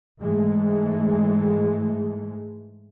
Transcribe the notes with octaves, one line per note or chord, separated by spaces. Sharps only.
G#2 E3 G#3 A3